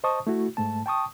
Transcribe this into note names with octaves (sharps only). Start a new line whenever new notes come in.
C5 D#5 A5 C#6 D#6
A3 E4 F#4
G#2 A3 A5
G5 A5 C#6 D#6